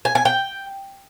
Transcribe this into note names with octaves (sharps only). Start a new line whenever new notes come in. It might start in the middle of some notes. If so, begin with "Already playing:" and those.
G#5
G#5
G5